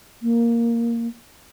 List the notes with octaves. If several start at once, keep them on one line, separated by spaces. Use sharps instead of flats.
A#3